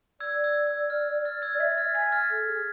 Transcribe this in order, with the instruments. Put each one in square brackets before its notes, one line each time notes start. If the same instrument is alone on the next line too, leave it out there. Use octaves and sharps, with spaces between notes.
[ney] D5 [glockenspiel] E6 G#6
[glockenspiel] E6
E6
F6
F6 A6
E6 G#6
[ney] D5 [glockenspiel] A6
[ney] E5 [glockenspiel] G#6 B6
[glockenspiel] F6 A6
[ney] G#5 [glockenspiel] G#6 B6
[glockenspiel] F6 A6
[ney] A4
G#4